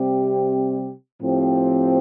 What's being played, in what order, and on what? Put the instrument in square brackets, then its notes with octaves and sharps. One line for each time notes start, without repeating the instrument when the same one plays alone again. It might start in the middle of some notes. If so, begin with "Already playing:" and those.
Already playing: [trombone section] C3 G3 C4 G4
A2 F3 C4 G4